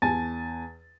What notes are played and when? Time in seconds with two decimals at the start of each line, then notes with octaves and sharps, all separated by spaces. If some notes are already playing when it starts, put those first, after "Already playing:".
0.02 E2 G#5 A5 A6